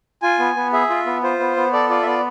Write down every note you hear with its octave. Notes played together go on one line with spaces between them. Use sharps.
F4 G#5
B3
B3
G#4 E5
F4
B3
F4 C5
B3
B3
A4 D5
F4 D5
E5
B3 D5